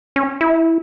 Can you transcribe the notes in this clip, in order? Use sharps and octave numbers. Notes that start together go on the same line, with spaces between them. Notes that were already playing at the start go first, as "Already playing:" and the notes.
C#4
E4